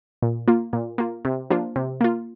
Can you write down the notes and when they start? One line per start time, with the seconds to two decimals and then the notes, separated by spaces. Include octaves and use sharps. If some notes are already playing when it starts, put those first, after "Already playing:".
0.22 A#2
0.48 A#3 F4
0.73 A#2
0.98 A#3 F4
1.25 C3
1.50 F3 A#3 D4 F4
1.76 C3
2.01 A#3 F4